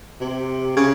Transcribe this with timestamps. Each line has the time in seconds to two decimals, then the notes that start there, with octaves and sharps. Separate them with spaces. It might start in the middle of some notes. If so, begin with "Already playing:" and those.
0.21 C3
0.76 C#3